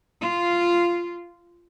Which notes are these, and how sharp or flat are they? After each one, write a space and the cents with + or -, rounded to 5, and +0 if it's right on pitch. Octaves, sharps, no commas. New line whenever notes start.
F4 -10